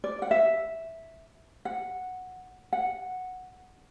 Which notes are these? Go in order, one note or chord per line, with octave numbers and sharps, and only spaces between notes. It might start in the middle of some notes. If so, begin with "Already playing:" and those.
D5
F#5
E5
F#5
F#5